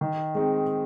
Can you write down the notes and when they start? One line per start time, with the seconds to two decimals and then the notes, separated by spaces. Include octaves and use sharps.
0.01 D#3
0.35 G#3 C4 D#4